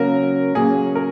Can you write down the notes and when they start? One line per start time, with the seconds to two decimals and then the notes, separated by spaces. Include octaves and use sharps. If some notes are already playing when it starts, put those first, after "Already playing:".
Already playing: C#3 F#3 A#3 C#4 A#4
0.55 C#3 F#3 A#3 C#4 G#4
0.95 A#4